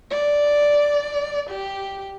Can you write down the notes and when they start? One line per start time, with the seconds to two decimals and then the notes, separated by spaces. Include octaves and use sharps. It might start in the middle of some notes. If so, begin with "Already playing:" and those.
0.11 D5
1.50 G4